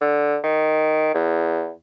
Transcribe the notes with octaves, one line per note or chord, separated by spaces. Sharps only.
D3
D#3
E2